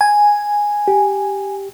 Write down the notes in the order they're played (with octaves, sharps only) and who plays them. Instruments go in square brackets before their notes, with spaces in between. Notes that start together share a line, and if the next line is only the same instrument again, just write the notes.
[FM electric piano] G#5
[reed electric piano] G4